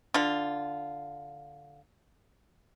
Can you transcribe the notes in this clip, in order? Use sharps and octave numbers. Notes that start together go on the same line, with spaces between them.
D3 F4